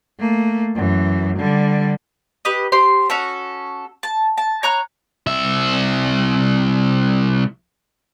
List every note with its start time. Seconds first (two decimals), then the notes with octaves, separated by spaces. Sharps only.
0.19 A3 A#3
0.75 F#2 E3
1.37 D3 G3
2.45 G4 B4 D#5
2.72 G4 C5 C6
3.10 C#4 F#4 A4
4.03 A5
4.38 A5
4.63 C#5 A#5 F#6
5.27 C2 E5